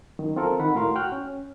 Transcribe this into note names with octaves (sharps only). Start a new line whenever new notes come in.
F#2 D#3
C4 F4 A4 A#4
D#3 F#5 B5
A2 F#4 A#4 F5 C6
F#4 G5 F6 F#6
C#4